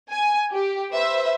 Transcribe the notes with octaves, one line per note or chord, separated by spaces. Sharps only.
G#5
G4
B4 C5 E5